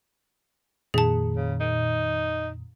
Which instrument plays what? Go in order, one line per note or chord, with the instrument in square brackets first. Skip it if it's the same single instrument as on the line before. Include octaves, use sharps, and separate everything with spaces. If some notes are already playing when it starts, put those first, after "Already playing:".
[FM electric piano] F2 A#2 D#3 [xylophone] G#4 A5
[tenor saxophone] C#3
D#4